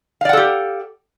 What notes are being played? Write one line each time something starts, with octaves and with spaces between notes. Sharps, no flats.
G4 A4 D5 F5 F#5